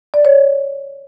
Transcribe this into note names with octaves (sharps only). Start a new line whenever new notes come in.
D5
C#5